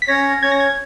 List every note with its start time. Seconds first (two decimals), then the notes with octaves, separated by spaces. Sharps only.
0.02 B6
0.08 C#4 C#5 A#6
0.43 C#4 C#5 G#6
0.52 A#6
0.60 G#6